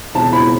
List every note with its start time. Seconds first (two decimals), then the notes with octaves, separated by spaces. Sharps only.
0.15 E1 A5
0.33 E1 B5